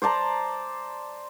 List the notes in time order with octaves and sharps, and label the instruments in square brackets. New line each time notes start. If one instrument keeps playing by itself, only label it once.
[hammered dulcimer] C5 D5 A5 A#5